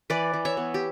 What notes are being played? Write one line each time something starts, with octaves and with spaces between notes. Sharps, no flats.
E3 B4 D5
E3
C#5 E5
B3
G4